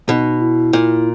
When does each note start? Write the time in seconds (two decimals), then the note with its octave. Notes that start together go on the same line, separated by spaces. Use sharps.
0.09 B2 D#4
0.41 E4
0.73 A#2